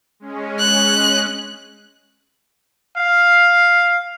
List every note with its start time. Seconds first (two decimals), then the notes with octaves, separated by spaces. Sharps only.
0.20 G#3 C#4
0.60 F#6
2.97 F5